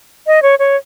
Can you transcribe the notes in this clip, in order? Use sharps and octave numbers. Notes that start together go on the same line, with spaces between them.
D#5
C#5
C#5